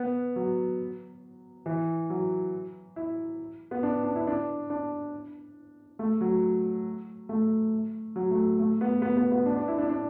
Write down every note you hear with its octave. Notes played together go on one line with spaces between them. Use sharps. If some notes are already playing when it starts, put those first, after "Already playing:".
Already playing: B3
F#3
E3
F#3
E4
B3
D4
D4
E4
D4
D4
A3
F#3
A3
F#3
A3
A3
B3
B3
B3
B3
D4
D4
E4
D4
D4